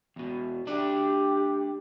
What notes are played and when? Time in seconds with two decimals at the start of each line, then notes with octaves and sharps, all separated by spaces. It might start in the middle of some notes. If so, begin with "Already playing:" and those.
0.16 E2 B2
0.67 A3 D4 G4 D5